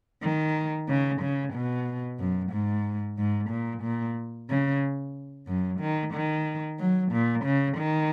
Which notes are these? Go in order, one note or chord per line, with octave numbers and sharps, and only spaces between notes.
D#3
C#3
C#3
B2
F#2
G#2
G#2
A#2
A#2
C#3
F#2
D#3
D#3
F#3
A#2
C#3
D#3